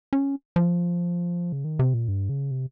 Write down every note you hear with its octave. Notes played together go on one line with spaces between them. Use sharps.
C#4
F3
C#3
D#3
C3
A#2
G2
C#3
C3